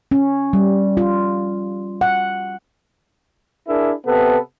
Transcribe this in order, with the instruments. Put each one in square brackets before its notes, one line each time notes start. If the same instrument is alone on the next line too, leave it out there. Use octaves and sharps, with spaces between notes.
[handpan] C#4
G3
F4
F#5
[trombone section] D4 E4 G#4 A#4
C3 B3 A4 B4